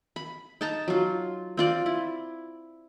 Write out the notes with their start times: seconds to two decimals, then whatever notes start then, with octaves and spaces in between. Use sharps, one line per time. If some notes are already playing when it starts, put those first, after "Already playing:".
0.16 B5
0.61 D#4 A5 A#5
0.88 F#3 F4
1.57 C4 F4 D5
1.86 E4